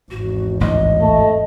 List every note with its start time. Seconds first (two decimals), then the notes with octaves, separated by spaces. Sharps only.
0.11 G#1 E2 F#4
0.61 A1 D2 D#5
1.01 A3